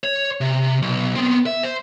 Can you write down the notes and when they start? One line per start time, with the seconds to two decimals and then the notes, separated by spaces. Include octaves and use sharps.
0.04 C#5
0.41 C3
0.82 B1
1.16 B3 C4
1.46 E5
1.63 C5